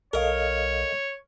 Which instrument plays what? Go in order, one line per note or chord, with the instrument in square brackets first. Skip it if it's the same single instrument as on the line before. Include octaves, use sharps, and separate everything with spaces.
[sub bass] B1 [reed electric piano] A4 D#5 F5 [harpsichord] A#4 [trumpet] C#5